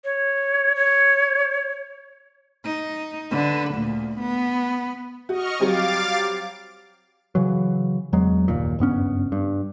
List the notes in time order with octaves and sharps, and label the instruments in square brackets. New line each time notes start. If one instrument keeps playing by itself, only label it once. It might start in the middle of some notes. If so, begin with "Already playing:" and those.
[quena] C#5
C#5
[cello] D#4
D3 B4
D2 A#2
B3
[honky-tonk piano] F#4 [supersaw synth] D#5 C#6 F6
[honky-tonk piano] F#3 G3 C4 [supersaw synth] F5 D6 A6
[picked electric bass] C#3 E3 F#3
E2 F#3 G#3
F#1 D#2 A#2
F#1 G2 B3 C#4
G2